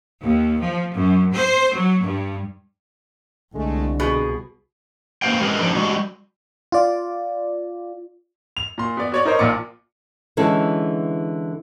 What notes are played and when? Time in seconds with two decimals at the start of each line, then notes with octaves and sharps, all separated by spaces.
0.23 D#2
0.61 F3
0.95 F#2
1.34 C5
1.74 F#3
2.04 G2
3.55 C2 D3 G#3 A3
4.00 B2 G#4
5.22 A#3 B4 C5 F5 G5
5.41 G#3 G#4 A#4 B4
5.60 F3 D4 D#4
5.75 G3 G#3 F#4
6.72 F4 D5
8.57 F7
8.78 A#2 C6
8.97 B3 D5
9.12 F#4 C#5 D5
9.25 D#4 A#4 C5 C#5
9.39 A#1 A#2 F4 D5 D6 C#7
10.37 D3 E3 G#3 C#4 A4